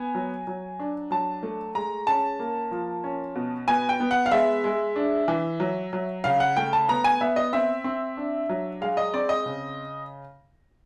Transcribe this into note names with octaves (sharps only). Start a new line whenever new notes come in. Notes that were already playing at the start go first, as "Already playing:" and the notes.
Already playing: B3 G#5
F#3
F#3
D4
F#3 A5
A3
G#3 A#5
C#4 A5
A#3
F3
C#4
B2
B3 G#5
G5
B3
F#5
F5
G#3 E5
G#3
D4
E3
F#3
F#3
C#3 F5
F#5
A3 G5
A5
B3 A#5
G#5
B3 E5
D#5
C4 E5
C4
D4
F#3
G#3 F5
D#5
C4 D5
D#5
C#3